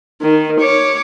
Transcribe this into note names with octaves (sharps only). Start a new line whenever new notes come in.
D#3
C#5 D6